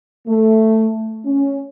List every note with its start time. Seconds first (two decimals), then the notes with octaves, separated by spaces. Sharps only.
0.27 A3
1.25 C#4